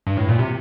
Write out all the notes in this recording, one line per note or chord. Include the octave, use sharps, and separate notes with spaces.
G2
A2
A#2
C3